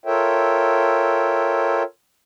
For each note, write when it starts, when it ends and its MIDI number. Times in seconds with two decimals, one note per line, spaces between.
0.06 1.83 65
0.06 1.83 69
0.06 1.83 70
0.06 1.83 73
0.06 1.83 76
0.06 1.83 79